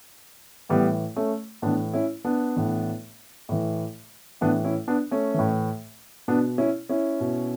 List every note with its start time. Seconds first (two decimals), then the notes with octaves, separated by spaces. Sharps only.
0.69 A2 E3 G3 B3
1.16 A3 C#4
1.62 A2 E3 B3 D4
1.94 C#4 E4
2.25 B3 D4
2.56 A2 E3
3.49 A2 E3
4.41 A2 E3 B3 D4
4.64 C#4 E4
4.88 B3 D4
5.11 A3 C#4
5.34 A2 E3
6.28 B2 B3 D4
6.58 C#4 E4
6.89 C#4 E4
7.20 B2